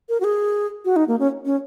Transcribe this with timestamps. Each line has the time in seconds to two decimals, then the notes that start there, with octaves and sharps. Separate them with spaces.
0.09 A#4
0.20 F#4
0.24 G#4
0.85 F#4
0.96 D#4
1.08 A#3
1.19 C#4
1.45 C#4